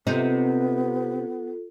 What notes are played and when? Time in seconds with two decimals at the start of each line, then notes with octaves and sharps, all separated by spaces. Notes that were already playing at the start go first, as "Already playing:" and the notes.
0.07 C3 B3 C4 D#4 F4 A4